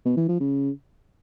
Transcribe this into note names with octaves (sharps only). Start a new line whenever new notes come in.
B2
E3
F3
C#3